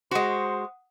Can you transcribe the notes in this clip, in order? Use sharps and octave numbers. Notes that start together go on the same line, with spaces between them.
G#3 F#4 C5 F#5 D#6